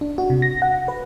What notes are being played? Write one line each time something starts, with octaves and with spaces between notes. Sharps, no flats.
D4
F#4
C3
A#6
F#5
B4